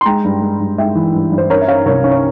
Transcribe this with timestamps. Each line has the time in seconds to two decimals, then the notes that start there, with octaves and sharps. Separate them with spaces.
0.01 C6
0.06 G#3 G5 A#5
0.24 G2
0.41 G#3
0.60 G2
0.78 G#3 E5 G5
0.95 E3
1.14 G2
1.32 G2
1.38 C5
1.49 C#4 A#4 C#5
1.61 E5
1.68 C#4 C#5 F5
1.86 C2 A#4 C#5
2.04 C#4
2.11 C#5